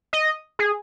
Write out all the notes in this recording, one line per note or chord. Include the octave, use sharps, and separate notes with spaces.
D#5
G#4